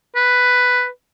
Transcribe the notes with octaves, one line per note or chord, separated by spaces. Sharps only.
B4